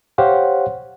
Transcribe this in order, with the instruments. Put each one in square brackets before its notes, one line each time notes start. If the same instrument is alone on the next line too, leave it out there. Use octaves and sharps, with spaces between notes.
[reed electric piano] G4 C5 C#5 F5 F#5